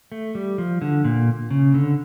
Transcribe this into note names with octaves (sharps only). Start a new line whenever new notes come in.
A3
G3
F3
D3
A#2
C#3
D3